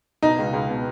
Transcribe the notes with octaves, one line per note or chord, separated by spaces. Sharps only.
B2 D#4
C#2
C#2
B2